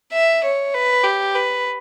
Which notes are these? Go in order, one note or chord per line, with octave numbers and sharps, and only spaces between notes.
E5
C#5
B4
G4
B4